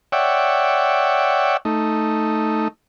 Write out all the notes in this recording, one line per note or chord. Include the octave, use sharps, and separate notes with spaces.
C#5 D5 E5 F#5 G5
A3 D#4